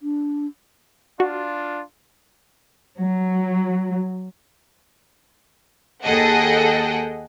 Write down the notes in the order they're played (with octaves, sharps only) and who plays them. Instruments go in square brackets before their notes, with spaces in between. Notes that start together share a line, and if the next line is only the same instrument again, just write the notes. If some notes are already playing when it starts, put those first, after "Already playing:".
[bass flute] D4
[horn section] D4 F4 [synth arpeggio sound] F#4
[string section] F#3
D#2 G#4 A4 D#5 F#5 G5